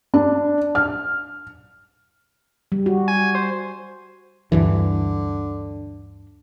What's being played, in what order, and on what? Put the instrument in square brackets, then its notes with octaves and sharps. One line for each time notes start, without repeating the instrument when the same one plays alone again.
[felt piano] D4
F6
[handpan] G3
F#4
[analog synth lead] G#5
C5
[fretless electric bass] D2 G2 E3 [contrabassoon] D3